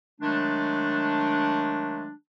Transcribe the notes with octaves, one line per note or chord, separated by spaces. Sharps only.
D#3 F#3 G#3 A3 D4